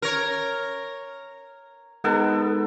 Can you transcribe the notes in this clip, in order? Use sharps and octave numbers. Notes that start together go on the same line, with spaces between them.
A#4 C#5
G#3 B3 D#4 A4 A#4